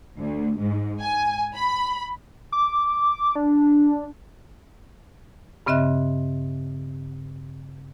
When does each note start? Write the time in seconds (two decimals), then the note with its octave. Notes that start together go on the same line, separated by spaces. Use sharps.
0.17 D2
0.58 G#2
1.00 G#5
1.55 B5
2.52 D6
3.35 D4
5.66 G2 C#3 C4 D#5 E5 F#6